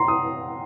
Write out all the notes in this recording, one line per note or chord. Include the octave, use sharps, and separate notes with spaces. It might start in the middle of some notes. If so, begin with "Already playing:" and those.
Already playing: A#5 C6
D#6